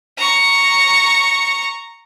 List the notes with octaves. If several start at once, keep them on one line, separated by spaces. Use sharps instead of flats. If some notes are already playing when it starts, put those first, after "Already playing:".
A#5 C#6